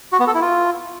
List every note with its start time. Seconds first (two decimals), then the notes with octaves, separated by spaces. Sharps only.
0.13 F#4
0.20 B3
0.27 A4
0.34 E4
0.42 F4